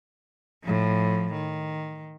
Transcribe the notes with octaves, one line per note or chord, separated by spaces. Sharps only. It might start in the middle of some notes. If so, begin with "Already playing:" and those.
A2 F3
D#3